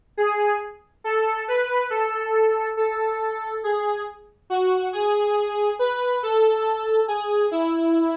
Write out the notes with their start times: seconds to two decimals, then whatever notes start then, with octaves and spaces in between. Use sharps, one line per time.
0.17 G#4
1.04 A4
1.48 B4
1.90 A4
2.77 A4
3.64 G#4
4.50 F#4
4.93 G#4
5.79 B4
6.23 A4
7.08 G#4
7.51 E4